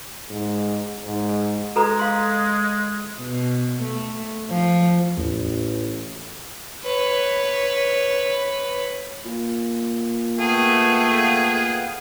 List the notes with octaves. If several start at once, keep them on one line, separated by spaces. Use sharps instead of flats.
G#2
G#2
G#3 A4 B4 A#5
F5 C6
B2
A3
F3
A1 E2
B4 C#5
A#2
A3 B3 G#4 F5 G5